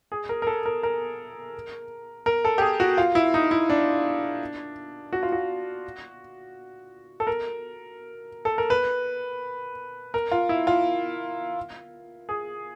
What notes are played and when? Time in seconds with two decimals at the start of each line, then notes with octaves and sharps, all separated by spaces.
0.12 G#4
0.29 A#4
0.42 A#4
0.47 A4
0.66 A#4
0.83 A#4
2.26 A#4
2.45 A4
2.58 G4
2.61 G#4
2.80 F#4
2.98 F4
3.15 E4
3.34 D#4
3.51 E4
3.70 D4
5.13 F#4
5.23 F4
5.32 F#4
7.20 A4
7.27 A#4
8.45 A4
8.58 A#4
8.70 B4
10.14 A#4
10.31 F4
10.49 E4
10.67 F4
12.29 G#4